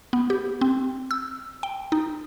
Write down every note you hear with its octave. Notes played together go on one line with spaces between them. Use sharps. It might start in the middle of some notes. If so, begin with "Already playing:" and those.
B3
G4
C4
E6
G5
D#4